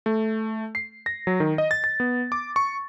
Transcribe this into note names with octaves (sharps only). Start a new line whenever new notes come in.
A3
C7
A#6
F#3
D#3
D#5
A6
A6
B3
D6
C#6